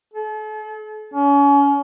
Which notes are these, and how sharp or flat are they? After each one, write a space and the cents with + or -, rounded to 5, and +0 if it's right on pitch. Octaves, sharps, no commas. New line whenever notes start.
A4 -40
C#4 +30